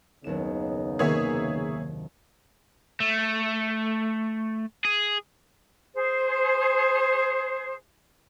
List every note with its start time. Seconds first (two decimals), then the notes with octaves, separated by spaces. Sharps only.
0.24 F#1 D#2 C#3 B3 D#4 E7
0.99 C3 D#3 A#3 G#4 C#5 E5
3.00 A3
4.85 G#4
5.94 G#4 C5